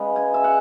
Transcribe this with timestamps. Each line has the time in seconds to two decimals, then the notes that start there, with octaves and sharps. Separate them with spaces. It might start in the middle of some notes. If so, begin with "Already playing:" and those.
Already playing: C#3 G#3 B3
0.16 G#5
0.34 E5
0.44 F#5